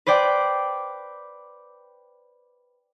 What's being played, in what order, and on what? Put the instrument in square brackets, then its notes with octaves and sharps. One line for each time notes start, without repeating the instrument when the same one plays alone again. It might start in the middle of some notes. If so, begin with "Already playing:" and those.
[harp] B4 C5 D5 G5 D6